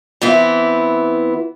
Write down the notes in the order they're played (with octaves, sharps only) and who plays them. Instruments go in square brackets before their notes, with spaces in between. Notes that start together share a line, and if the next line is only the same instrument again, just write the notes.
[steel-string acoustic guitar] E3 B3 C4 E4